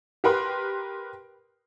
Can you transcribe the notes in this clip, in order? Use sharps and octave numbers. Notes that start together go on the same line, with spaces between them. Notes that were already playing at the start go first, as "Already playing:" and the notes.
G4 A#4 B4 C6